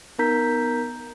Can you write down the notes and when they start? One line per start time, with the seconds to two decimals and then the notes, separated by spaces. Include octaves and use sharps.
0.19 B3 D#4 A#4 A#5 G6 B6